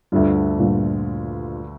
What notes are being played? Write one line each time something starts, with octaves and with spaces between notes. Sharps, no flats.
D2 G2 D3 A3 D4 F4
G2 A#2